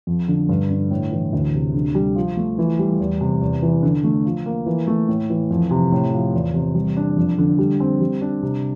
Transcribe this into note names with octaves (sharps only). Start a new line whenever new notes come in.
F2
D3
G2
D3
A2
E3
D2
C3
D3
G3
F3
A3
E3
G3
E2
C3
E2
E3
D3
A3
F3
A#3
E3
A3
A2
E3
F2
C3
A2
F3
E2
C3
G3
D4
F2
D3
G3
C4
G3
D4
C3